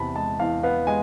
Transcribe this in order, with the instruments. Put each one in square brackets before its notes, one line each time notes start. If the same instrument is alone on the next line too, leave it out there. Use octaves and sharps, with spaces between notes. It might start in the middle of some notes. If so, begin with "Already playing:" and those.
Already playing: [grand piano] E2 C3 A5 B5
G#3 A5
E2 F5
B3 F5
G#3 G#5